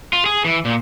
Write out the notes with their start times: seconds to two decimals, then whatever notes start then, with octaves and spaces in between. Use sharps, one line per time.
0.13 F4
0.26 G#4
0.45 E3
0.65 A#2